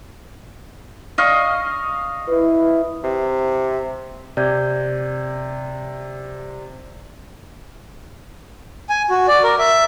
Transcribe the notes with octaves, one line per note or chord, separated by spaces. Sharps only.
D#5 F5 C#6
E4 B4
C3
C3 D5 G6 G#6
G#5
F#4
D5
A#4
E5